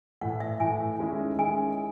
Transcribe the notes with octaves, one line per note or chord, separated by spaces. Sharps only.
A2 E3 A3 F#5
E5
A2 E3 A3 G#5
D#3 G#3 C#4 E4 G#4
D#3 G#3 C#4 E4 G#4 G#5